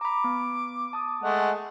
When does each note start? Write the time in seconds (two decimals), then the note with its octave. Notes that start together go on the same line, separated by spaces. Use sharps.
0.01 A#5 B5 D6
0.24 B3
0.93 A5 D#6
1.23 G#3 A3 D#5 F#5